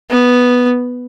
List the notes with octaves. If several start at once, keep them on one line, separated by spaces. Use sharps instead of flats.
B3